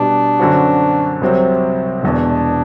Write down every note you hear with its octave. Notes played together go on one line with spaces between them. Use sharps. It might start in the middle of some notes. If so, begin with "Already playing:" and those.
Already playing: B2 G3 B3 D4
F#2 D3 F#3 C4 F#4
C2 C3 F#3 C4
E1 E2 B2 D4